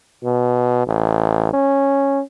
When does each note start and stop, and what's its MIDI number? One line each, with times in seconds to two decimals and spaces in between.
0.24 0.85 47
0.87 1.53 33
1.53 2.21 61